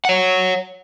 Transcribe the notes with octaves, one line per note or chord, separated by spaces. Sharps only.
C#5 F#5